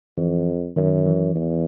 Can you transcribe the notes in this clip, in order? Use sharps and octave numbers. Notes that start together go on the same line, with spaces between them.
F2 E3
F#2 D#3
E3
E2